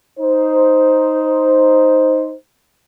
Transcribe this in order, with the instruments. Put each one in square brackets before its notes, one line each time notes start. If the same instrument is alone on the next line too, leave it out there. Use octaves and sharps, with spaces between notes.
[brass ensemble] D#4 C5